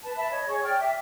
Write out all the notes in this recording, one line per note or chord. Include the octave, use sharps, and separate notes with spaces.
B4 A5
E5 A5 B5
C#5 D#5
G#4 C#5 C#6
D5 G5 F6
E5 D6